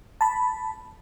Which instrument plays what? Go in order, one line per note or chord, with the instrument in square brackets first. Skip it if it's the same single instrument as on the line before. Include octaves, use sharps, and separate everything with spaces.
[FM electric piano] A5 B5